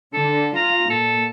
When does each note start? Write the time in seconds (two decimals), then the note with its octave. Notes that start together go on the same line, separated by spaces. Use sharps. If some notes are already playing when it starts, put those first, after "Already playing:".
0.14 D3 A4
0.55 F4 A#5
0.90 A#2 A4